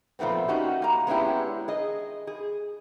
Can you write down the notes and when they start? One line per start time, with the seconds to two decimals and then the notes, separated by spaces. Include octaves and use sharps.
0.19 A#2 F3 A3 B3 C4
0.48 C#4 D#4 F#4 G4
0.82 A#3 A#5
1.07 G#3 B3 C#4 D4 E4 G4
1.68 G#4 D#5
2.27 G#4